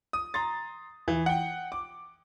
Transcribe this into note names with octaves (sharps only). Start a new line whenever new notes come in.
D#6
A#5 C6 A6
E3
F#5 G5
D6